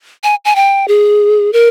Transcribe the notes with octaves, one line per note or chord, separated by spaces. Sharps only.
G#5
G#5
G5
G#4
A#4